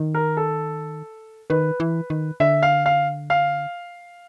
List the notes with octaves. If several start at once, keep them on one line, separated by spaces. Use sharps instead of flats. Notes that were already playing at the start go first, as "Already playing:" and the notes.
Already playing: D#3
A#4
A4
D#3 B4
E3
D#3
D3 E5
F5
F5
F5